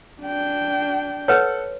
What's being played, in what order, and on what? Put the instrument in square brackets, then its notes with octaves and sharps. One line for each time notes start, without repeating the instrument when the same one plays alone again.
[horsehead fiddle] D4 G5
[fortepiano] A4 F#5 [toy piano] B4 C#5